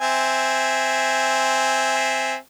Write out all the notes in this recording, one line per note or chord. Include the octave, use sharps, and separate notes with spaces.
C4 E5 G#5